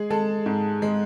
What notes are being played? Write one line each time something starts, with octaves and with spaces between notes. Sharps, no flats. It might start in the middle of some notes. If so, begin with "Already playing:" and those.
Already playing: G#3 G#4
G#3 A4 A5
G#2
G#3